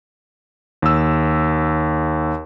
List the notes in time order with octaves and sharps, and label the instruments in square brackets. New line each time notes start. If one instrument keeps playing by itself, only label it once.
[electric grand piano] D#2 E6